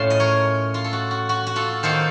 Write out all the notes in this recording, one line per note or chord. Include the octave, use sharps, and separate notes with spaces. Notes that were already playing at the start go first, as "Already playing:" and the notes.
Already playing: A2 A3 C#4 F4 A5 C6
D#5
A#4 C#5
F4
A4
F#4
F#4
F#4
F#4
F4 A4
D#3 A#3 D#4 A4 C5